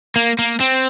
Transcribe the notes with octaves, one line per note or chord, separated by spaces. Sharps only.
A#3
A#3
C4